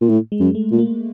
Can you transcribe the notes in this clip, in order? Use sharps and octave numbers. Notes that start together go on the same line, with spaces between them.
A#2
A2
G#3
F#2
A3
A#2
A#3